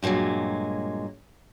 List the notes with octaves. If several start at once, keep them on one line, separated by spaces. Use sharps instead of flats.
G2 A#2 D3 F#3 G#3